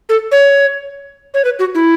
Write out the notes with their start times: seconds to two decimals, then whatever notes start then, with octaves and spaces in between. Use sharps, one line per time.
0.09 A4
0.31 C#5
1.34 C#5
1.44 B4
1.59 F#4
1.74 E4